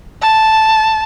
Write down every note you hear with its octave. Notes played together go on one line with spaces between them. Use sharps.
A5